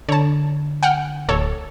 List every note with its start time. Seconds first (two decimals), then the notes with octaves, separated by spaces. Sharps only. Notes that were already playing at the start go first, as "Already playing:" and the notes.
0.09 D3 C#5 A5
0.83 F#5 G5 F6
1.29 D1 A4 C#5